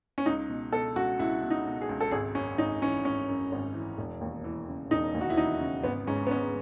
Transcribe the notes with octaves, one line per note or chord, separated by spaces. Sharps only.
C#4
C#2 D#4
B2
B2 A4
C#2 F#4
C#2 E4
B2
D#4
B2
G#4
C#2
A4
G#1 G#4
F#2 C#4
G#1 D#4
E3 C#4
G#1 C#4
F#2
G#1
E3
E1
D#2
E3
C#3
E1 D#4
D#2
F#4
E4
E3 D#4
C#3
G#1 B3
G#2 C#4
B3
G#1 C#4